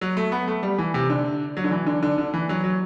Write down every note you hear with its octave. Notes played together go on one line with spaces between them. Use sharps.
F#3
A3
B3
A3
G3
E3
C3
D3
F#3
D3
E3
D3
D3
D3
E3
F#3
F#3